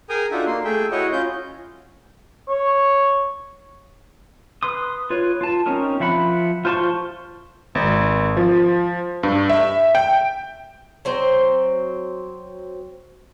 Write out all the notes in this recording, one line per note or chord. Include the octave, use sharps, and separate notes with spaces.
G#4 A#4 G5 G#5 A#5 D#6
D4 D#4 F4 F#4 A4 E5
A#3 C6
A3 G#4 E5 G5
E4 F#4 C#5 D#5
C#4 F4 G6
C#5
B4 C6 D#6
F4 B4 C#5
F4 A5
C4 C#4 D#4 A#4
F3 E5 F#5 B5
F4 C5 A5 C6 C#6
G#1
F3
G2
E5
G5
F#3 C4 C5